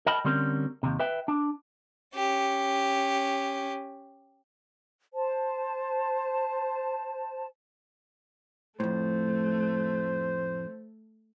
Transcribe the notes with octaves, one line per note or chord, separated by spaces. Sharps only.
A#4 D#5 G5 A5 B5
D3 G3 C4 C#4 A#4
D#2 C3
B4 E5 G5
D4
C#4 G4
C5 A5
F2 A2 A3 C5